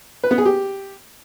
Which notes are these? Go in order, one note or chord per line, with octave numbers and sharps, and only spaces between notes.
B4
B3
G#4
G4